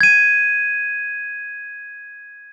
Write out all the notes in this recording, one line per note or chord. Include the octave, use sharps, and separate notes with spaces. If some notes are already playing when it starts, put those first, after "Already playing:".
G#6 D#7